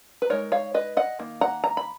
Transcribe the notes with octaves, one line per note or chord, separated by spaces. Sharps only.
B4
G#3 D#4 A#4 C#5
C#5 F5
B4 D#5
D#5 F#5
D#3 A#3
F#5 A#5
A#5
B5